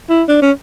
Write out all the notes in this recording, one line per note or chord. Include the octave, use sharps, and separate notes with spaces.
E4
D4
C#4